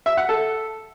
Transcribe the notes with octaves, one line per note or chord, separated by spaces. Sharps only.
E5
F#5
A4